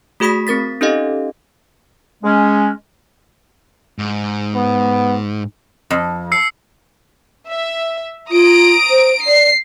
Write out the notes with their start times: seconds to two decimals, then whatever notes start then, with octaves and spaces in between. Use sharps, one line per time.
0.20 A3 F#4 G#4 B5 D#6 B6
0.47 C4 A#4 A6 B6
0.81 C#4 D#4 G4 A4 D#5 F5
2.24 G#3 C#4
3.99 G#2
4.55 B3
5.91 F2
6.32 E6 C7 C#7
7.48 E5
8.31 F4 A#5 D#6 D7
8.90 C5
9.27 D5 C7